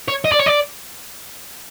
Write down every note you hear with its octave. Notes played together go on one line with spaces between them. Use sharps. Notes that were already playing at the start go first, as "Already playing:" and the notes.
C#5
D#5
D5
C#5
D5